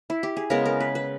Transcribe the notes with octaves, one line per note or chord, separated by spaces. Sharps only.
E4
G4
G#4
C#3 G#3 B3 A#4
A#4
B4
B4